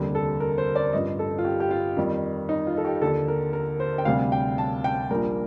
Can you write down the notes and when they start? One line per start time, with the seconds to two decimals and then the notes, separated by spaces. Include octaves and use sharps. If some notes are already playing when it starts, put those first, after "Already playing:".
Already playing: F1 D#2 D3 G3
0.15 A4
0.40 A#4
0.58 C5
0.76 D5
0.93 A1 G2 F3 D#5
1.19 A4
1.38 F4
1.45 G4
1.60 G4
1.71 F4
1.97 F2 D#3 G3
2.49 D#4
2.67 F4
2.78 A4
2.85 G4
3.01 D#2 D3 F3 A4
3.28 A#4
3.53 A#4
3.80 C5
3.98 G5
4.05 D2 C3 G3 F5
4.32 G5
4.58 A5
4.84 G5
5.11 A#1 A#2 G3 A#4